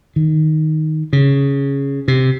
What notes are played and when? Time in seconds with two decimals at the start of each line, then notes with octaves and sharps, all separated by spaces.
0.16 D#3
1.13 C#3
2.08 C3